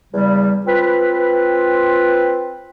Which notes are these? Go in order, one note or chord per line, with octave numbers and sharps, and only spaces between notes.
E2 C#3 G3
C4 F4 B4